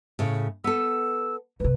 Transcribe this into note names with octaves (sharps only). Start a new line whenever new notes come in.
A2 C#3
B3 A4 E6
F#2 C3 B4